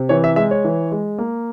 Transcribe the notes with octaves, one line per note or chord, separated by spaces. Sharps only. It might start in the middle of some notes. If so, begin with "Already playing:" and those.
Already playing: C3
E3 C#5
E5
G#3 E5
C#5
E3
G#3
A#3